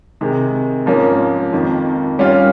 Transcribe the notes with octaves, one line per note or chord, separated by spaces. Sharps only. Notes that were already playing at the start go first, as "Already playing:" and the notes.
C3 D#3 G#3
G#2 F3 A#3 C#4
F2 D#3 A#3
G3 C#4 F4